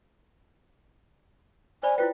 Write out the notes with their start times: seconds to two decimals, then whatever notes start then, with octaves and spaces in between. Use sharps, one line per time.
1.83 C5 D5 G#5 B5
1.98 E4 F4 B4 G5